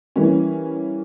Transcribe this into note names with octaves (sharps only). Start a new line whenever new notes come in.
E3 G3 A#3 C#4